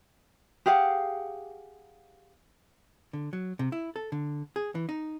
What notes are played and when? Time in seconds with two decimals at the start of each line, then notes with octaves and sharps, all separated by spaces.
0.66 G4 G#4 F5 F#5
3.13 D3
3.33 F#3
3.59 C3
3.72 E4
3.96 A4
4.12 D3
4.56 G#4
4.75 E3
4.89 D#4